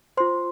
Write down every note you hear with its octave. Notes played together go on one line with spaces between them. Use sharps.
F4 C5 C6